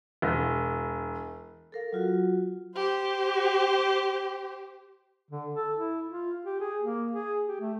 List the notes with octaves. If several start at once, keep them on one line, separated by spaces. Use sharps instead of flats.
E1
A4 A#4 F5
F#3 F4 F#4
G4 C5
D3
A4
E4
F4
G4
G#4
A#3
G#4
G4
A3